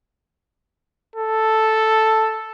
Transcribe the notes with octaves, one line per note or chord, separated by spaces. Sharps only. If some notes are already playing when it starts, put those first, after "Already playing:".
A4